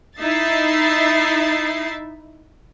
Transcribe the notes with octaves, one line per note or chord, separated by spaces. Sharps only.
D#4 E4 E5 A6 C7